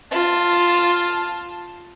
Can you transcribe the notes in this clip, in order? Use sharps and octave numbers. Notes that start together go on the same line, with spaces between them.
F4 A5